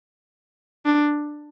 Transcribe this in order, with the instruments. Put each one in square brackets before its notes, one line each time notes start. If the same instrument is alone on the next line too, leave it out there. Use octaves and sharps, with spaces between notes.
[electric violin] D4